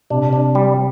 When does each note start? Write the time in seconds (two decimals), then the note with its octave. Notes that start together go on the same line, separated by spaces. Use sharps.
0.10 C3 D4
0.33 D4
0.55 G3